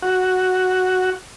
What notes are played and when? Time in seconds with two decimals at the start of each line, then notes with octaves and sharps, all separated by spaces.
0.02 F#4